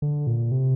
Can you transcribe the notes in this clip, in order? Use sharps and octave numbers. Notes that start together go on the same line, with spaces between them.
D3
A#2
C3